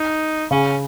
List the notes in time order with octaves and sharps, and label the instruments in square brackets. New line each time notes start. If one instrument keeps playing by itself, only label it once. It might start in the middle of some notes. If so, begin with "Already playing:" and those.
Already playing: [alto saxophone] D#4
[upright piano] C#3 [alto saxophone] C#4